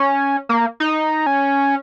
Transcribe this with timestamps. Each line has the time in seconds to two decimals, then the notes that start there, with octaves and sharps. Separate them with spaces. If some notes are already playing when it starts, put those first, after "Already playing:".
Already playing: C#4
0.49 A#3
0.80 D#4
1.26 C#4